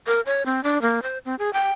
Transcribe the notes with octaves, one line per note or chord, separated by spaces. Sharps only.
A#4
C#5
C4
D4
A#3
C5
C4
G#4
G5